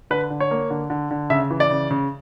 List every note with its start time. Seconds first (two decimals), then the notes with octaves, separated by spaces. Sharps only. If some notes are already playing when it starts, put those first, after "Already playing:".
0.11 D3 B4
0.30 D3
0.40 C#5
0.51 A#3
0.70 D3
0.90 D3
1.11 D3
1.30 C#3 E5
1.51 E3
1.60 D5
1.71 C#3
1.91 C#3